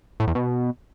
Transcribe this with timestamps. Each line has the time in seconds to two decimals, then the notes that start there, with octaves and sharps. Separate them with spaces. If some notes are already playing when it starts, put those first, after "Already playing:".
0.20 A2
0.27 E2
0.35 B2